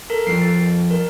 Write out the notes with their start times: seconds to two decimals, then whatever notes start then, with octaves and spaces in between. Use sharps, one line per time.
0.10 A4 A#4
0.27 F2 F3 C7 D7
0.42 A6
0.90 A#4